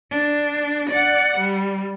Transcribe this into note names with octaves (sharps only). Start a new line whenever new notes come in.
D4
D5 F#5
G3